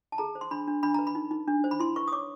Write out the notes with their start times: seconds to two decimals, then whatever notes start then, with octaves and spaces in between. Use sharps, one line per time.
0.12 A5
0.18 G#4 A#5
0.35 C5
0.41 C6
0.51 D4 B5
0.68 D4
0.83 D4 B5
0.94 B4 A#5
1.07 B5
1.15 D#4
1.31 D#4
1.48 D4
1.64 C5
1.71 B5
1.79 E4 C6
1.96 B4 C#6
2.08 D#6
2.12 C#5 D6